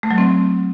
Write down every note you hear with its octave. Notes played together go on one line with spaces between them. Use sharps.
A3
F#3
C4